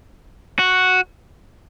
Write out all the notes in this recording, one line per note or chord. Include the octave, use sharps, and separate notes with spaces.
F#4